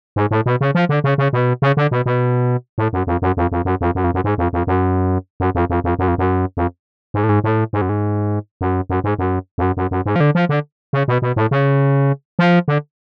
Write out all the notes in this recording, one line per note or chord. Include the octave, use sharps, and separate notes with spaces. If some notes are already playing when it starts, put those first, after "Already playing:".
G#2
A2
B2
C#3
F3
D3
C#3
C#3
B2
C#3
D3
B2
B2
A2
F#2
F2
F#2
F2
F2
F#2
F2
F#2
F2
F#2
G#2
F2
F2
F#2
F#2
F2
F2
F2
F#2
F2
F#2
F2
G#2
A2
G#2
A2
G#2
F#2
G#2
F#2
F#2
G#2
F#2
F2
F#2
F#2
F#2
G#2
F3
D3
F3
D3
C#3
B2
B2
A2
C#3
F3
D3